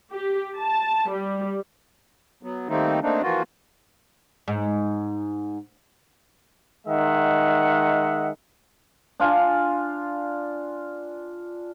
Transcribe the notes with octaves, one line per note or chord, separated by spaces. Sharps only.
G4
A5
G3
F#3 B3
D#3 G3 A3 A#3 C4 D#4
A3 A#3 C4 D4 D#4
E3 F3 A#3 F4 F#4
G#2
D#3 G#3 D#5 E5 F#5
D4 F4 G#5